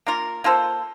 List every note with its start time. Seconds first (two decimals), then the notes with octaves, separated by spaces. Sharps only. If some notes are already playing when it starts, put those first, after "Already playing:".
0.06 A#3 F4 A#4
0.44 A#3 F4 A4 C5